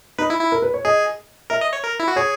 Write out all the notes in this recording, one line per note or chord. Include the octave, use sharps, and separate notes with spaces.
D#4 B4
E4
E4
A#4
B4
C#5
G#4 D#5
A#4 E5
D#5
C#5
A#4
E4
F#4
G#4 C#5